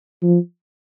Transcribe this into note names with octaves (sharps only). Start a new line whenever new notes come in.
F3